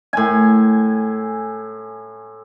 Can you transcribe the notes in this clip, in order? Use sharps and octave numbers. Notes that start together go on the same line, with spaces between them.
A2 G#5